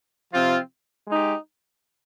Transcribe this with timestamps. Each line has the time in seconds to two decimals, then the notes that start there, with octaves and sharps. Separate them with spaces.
0.31 C3 F3 C4 F4
1.08 G#3 D#4 G4